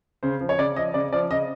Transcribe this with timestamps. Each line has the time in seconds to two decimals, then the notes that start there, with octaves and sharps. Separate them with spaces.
0.23 C#3 C5
0.41 F3
0.49 C#5
0.59 C#3 D5
0.76 F3 D#5
0.94 C#3 D5
1.13 F3 D5
1.31 C#3 D#5